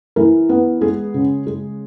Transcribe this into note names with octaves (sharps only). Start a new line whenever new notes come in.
E3 A#4
B3
G#3 G#4
C#3
G#3